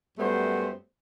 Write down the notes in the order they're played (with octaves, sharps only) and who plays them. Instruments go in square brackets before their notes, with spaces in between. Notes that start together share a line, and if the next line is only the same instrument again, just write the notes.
[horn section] F#2 G3 A3 B3 C5